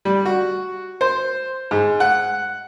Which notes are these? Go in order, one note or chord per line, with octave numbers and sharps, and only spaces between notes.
G3
F#4
C5
G#2
F#5